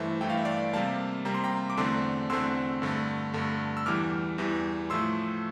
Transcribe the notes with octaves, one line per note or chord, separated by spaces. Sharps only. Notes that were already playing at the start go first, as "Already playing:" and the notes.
Already playing: G2 E3 A3 C5 E5
G2 E3 A3 G5
F5
E5
D5 F5
C3 G3 A#3 F5 A5
C3 G3 A#3 A#5
C6
G5 A#5
D6
E2 D3 A3 C4 A5 C6
E2 D3 A3 C4 C6 E6
G2 D3 A3
G2 D3 A3
E6
E2 E3 G3 D6 F6
E2 E3 G3
A2 F3 A3 C6 E6